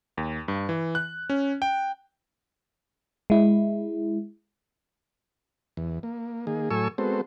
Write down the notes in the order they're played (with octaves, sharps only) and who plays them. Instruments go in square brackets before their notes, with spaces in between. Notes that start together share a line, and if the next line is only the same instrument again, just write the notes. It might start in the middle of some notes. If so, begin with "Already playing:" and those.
[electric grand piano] D#2
G2
E3
F#6
C#4
G5
[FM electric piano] G#3 E4
[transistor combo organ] E2
A#3
D#3 A#3 G#4
A2 F#3 A4 G#5 C#6 E6
G#3 B3 C4 F#4 A4 C5